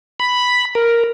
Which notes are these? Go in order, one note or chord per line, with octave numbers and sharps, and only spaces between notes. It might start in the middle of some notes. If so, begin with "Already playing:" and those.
B5
A#4